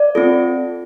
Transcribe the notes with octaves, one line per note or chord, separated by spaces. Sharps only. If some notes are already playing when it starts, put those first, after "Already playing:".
Already playing: D5
C4 F4 A4